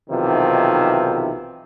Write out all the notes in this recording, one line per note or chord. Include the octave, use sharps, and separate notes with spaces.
B1 C3 D#3 E3 F4